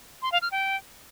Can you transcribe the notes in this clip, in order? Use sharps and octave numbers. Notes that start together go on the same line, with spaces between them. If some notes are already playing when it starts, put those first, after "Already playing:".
C6
F5
F6
G5